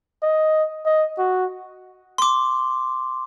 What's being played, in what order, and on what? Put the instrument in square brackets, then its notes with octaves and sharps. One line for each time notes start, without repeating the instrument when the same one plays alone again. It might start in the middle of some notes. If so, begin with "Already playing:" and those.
[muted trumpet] D#5
D#5
F#4
[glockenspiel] C6 D6